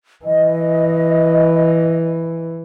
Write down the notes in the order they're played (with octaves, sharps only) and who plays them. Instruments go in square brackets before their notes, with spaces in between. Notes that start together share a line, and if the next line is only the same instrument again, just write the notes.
[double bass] E3 [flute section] D#5